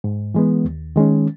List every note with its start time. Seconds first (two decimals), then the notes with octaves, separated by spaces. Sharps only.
0.04 G#2
0.34 E3 G#3 B3
0.65 D#2
0.96 D#3 G#3 C#4